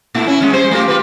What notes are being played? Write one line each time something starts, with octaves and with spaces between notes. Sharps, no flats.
A#2 A3 E4
C#4 E4
A#2 G#3 C#4
G3 G#4 C5
A3 F4 G4
F4 G4 B4